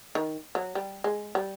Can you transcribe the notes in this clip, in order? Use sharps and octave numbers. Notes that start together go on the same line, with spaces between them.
D#3
F#3
G3
G#3
G3